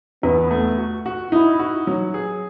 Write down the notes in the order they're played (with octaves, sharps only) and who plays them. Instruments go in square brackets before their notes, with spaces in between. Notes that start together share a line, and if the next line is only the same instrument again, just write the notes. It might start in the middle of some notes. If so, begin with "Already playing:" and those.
[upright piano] E2 [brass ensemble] B3
[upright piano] A3
F#4
F#4
[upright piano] D#4 [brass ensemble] E4
[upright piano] F#4
F#3
G#4